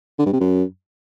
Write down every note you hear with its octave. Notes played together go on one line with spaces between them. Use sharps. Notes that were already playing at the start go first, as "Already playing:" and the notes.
D3
G2
C3
F#2